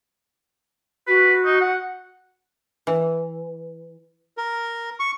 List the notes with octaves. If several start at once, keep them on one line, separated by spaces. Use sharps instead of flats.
F#4 B4
D#4
F#5
E3
A#4
C#6